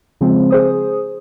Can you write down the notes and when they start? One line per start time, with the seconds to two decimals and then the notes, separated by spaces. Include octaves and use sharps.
0.21 C#3 F3 G#3 C4
0.50 G#4 C5 D#6